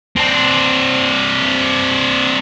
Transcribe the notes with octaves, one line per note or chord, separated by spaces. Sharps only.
C4 D4